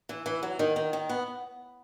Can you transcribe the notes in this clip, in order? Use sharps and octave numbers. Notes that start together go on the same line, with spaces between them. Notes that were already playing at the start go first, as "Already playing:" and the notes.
E3
E3
F#3
D#3
D#3
D#3
B3